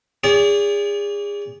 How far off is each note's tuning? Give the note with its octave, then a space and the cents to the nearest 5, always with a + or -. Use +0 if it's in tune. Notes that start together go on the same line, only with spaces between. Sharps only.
G#4 -30 D5 -40